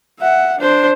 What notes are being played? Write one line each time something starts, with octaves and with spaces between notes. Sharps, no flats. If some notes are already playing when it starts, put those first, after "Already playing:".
E5 F#5
D4 C5